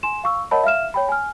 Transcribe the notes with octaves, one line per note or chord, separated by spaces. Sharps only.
G#5 C6 E7
F5 C#6 E6
A#4 C#5 D#5 F#5 A5 B5
E5 F5 F6 E7
C#5 G5 B5
G#5 F6